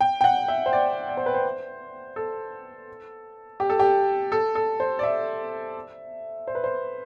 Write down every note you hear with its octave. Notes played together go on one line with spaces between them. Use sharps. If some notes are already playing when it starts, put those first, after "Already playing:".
G5
G5
F#5
E5
C5
D5
D5
C5
B4
C5
A4
G4
A4
G4
A4
A4
C5
D5
E5
C5
B4
C5